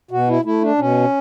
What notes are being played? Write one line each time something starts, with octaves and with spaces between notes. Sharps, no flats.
B2 F#4
E4
A3 E4
D4
B2 C#4